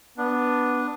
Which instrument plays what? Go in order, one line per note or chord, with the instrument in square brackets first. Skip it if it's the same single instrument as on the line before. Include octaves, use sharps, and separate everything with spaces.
[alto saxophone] B3 [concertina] D4